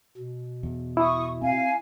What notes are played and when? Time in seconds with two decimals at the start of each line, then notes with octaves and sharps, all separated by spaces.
0.17 B2
0.63 E2
0.97 E4 C#6 D#6
1.42 C4 F5 G#5